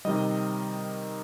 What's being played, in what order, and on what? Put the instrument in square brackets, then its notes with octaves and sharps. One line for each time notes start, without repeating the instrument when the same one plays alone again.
[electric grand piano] C3 D#3 G3 D#5